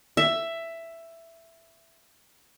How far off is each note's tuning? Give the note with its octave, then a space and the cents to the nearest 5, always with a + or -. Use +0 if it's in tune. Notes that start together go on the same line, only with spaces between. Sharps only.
E5 +10